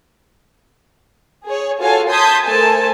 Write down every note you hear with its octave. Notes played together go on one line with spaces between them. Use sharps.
G#4 C#5
F4 F#4 A4 C#5 F5 G#5
A5 C6 D#6 G6 G#6 B6
A3 A4 A#4 C5 G#5 A5